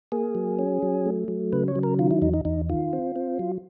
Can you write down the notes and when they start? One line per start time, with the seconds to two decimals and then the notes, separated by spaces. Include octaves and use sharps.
0.12 A#3 G#4
0.35 F#3
0.59 C#4
0.82 F#3
1.06 A3
1.28 F#3
1.52 C#3 B4
1.68 C#5
1.76 F#3
1.83 A#4
1.99 D#3 F4
2.11 E4
2.22 E2 D#4
2.34 D#4
2.45 E2 D#4
2.69 D#3 F4
2.93 C4
3.16 C4
3.39 F#3